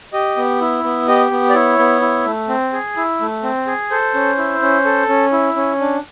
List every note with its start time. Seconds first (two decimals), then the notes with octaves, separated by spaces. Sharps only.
0.13 G4 D#5
0.37 B3
0.61 E4
0.84 B3
1.08 G4 D#5
1.31 B3
1.50 D5
1.54 E4 C#5
1.79 B3
2.01 E4
2.25 A3
2.49 C4
2.73 G#4
2.97 E4
3.21 A3
3.43 C4
3.67 G#4
3.91 A4 C5
4.14 C#4
4.38 E4
4.62 C#4
4.85 A4
5.09 C#4
5.32 E4
5.56 C#4
5.80 D4